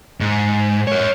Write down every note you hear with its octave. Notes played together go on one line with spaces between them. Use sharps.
G#2
A#4 C#5